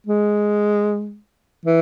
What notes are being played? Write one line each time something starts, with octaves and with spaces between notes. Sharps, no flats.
G#3
E3